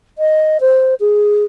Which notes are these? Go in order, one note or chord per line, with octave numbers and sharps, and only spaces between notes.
D#5
C5
G#4